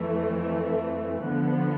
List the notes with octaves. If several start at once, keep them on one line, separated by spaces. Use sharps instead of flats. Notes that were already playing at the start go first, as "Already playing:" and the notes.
Already playing: F2 E3 A3
D3 F3 B3